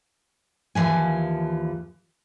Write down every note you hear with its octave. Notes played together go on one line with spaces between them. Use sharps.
D#2 E3 F3 G#5